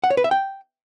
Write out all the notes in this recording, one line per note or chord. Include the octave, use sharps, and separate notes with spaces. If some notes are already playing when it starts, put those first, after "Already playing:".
F#5
C#5
B4
E5
G5